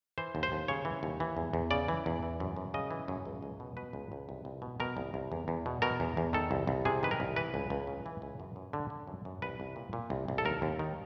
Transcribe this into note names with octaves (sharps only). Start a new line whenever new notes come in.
E3 C5
D#2
C5
D#2
C#3 C#5
E3
D#2
E3
E2
E2
C#3 D5
E3
E2
E3
F#2
F#2
C#3 D#5
E3
F#2
C#2
C#2
B2
B2 B4
C#2
C#2
C2
C2
B2
B2 A#4
C2
C2
E2
E2
B2
B2 A#4
E2
E2
D#3 A4
C2
C2
C3 G#4
D#3 B4
A#4
C2
E3 B4
C#2
C#2
C#3
E3
C#2
F#2
F#2
D3
D3
F#2
F#2
C2 B4
C2
A#2
A#2
C2
C2
A4
D#2 A#4
D#2
D#3